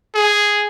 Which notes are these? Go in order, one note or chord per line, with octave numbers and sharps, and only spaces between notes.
G#4